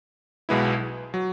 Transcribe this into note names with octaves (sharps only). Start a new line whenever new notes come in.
B1 B2 G#3 B3 E4
F#3